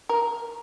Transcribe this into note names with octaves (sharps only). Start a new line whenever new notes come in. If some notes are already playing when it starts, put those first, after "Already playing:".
A#4